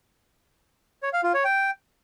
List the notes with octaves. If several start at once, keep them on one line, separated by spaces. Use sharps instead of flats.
C#5
F5
F4
C#5
G5